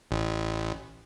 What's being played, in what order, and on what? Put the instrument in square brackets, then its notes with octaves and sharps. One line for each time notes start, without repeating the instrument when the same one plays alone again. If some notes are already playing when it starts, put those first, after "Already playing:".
[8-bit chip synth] A1